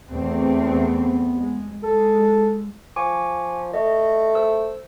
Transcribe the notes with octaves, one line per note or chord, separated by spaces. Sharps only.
E2 A3 C4
B3
G#3
G#3 A4
F3 G#5 C#6 D6
A3 D#5
C5 E6